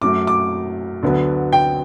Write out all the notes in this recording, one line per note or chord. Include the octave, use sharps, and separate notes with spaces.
F#2 F#3 A3 D6
D6
D2 D3 F#3 B3
G5